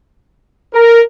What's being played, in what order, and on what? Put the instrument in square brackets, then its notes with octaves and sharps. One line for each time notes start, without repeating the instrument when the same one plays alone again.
[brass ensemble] A#4